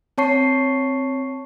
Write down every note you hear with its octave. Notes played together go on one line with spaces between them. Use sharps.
C4 C#5 A5 C#6 C7